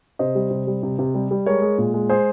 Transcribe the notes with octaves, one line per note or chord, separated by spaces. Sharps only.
C3 C5 D#5
G3
C3
G3
C3
C3
G3
G3
G#3 A#4 C#5
G#3
A#2
G#3
G#3 G#4 C5